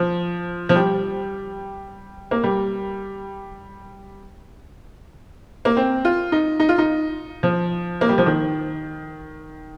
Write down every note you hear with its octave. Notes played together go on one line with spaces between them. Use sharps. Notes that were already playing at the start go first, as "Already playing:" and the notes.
Already playing: F3
F3
G3
A#3
G3
A#3
C4
F4
D#4
D#4
F4
D#4
F3
A#3
G3
F3
D#3